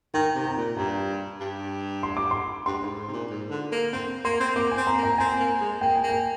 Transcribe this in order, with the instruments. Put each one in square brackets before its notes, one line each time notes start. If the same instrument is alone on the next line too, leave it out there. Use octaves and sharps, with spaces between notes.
[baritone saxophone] D#3 [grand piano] G5
[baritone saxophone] C3
[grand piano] A#5
[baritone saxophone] A#2
[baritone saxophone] G2 [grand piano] A#5
[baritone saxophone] G2
[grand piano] C6
D6
C6
[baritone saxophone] G2 [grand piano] C6
[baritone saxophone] G#2
G#2
C3
A#2
G#2
D3
A#3
[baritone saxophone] C4 [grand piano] C6
[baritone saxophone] A#3 [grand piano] C6
[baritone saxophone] C4
[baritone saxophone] A#3 [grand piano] D6
[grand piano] G#5
[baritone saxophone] C4
[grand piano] A#5
[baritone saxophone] A#3
[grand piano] A#5
[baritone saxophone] C4 [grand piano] G#5
[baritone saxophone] A#3
G#3
[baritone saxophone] A#3 [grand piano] G5
[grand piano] G#5
[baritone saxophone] A#3
[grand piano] G5